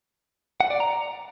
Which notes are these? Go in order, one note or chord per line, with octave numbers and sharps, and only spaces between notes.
F#5
D5
A#5